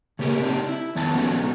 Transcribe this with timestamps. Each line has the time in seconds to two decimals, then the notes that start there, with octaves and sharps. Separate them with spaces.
0.19 C#3 A#3 G4 A#4
0.42 C4 D4 D#4 G4
0.69 E4
0.95 F2 D#3 B3 G#5 A5
1.15 F3 A3 B3 C#4 D#4 F#4